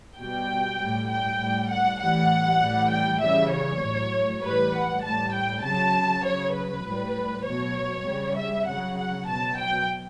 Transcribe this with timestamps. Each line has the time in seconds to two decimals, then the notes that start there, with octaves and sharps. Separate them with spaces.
0.18 B2 G3 G5
0.79 A2 G3
1.09 G5
1.40 A2 G3
1.70 F#5
2.00 A2 E3 G3 F#5
2.61 A2 E3 G3
2.90 G5
3.21 C#3 E3 G3 E5
3.52 C#5
3.82 A2 F#3
4.42 A2 E3 G3 B4
4.73 F#5
5.03 A2 G3 A5
5.34 G5
5.63 C#3 F#3 A5
6.24 C#3 F#3 C#5
6.55 B4
6.85 A2 G3
7.45 B2 F#3 C#5
8.06 C#3 G3
8.36 E5
8.66 C#3 F#3 F#5
8.97 F#5
9.27 B2 F#3 A5
9.58 G5